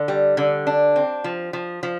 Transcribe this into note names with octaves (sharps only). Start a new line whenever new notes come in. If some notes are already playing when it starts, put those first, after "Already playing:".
Already playing: D3
G3
D3
D4
C4
F3
F3
F3